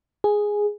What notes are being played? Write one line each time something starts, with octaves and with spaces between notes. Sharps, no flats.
G#4